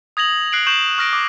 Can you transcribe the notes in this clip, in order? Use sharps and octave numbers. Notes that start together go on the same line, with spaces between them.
D#6 G#6 A#6 F7 F#7
F#6 C7 D7 F#7
C#6 G6 E7 F#7
C#6 F6 A#6 D7
D6